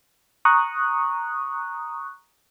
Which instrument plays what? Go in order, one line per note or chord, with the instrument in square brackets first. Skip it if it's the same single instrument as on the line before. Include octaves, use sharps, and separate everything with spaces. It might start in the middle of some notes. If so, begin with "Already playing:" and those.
[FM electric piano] A#5 C#6 D#6 F#6